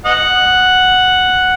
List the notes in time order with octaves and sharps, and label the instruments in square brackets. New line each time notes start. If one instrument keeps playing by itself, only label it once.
[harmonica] D#5 F#5